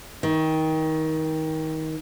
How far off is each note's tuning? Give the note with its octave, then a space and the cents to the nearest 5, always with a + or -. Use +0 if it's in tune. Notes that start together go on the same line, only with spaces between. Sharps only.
D#3 +25